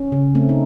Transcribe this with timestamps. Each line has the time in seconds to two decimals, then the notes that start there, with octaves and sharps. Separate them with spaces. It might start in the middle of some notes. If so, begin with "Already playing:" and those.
Already playing: C#4
0.12 C#3
0.35 A3 C4
0.49 D#4